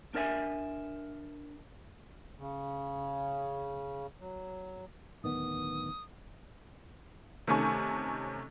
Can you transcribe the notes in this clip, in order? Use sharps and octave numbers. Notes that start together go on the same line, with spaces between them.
D4 A#4 D5 E5 G#5
C#3
F#3
D1 D#3 B3 D#6
C3 D#3 A3 C#4 G#5 C#6